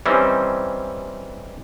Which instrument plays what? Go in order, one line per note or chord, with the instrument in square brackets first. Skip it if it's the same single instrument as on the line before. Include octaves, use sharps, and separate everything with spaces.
[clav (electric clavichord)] E3 G3 C4 C#4 D#4 C5